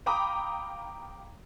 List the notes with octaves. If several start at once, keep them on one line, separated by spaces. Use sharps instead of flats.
F5 G5 A#5 B5 D6 D#6